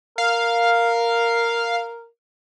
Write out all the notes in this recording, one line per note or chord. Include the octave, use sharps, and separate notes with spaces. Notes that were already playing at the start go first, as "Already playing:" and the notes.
A#4 F5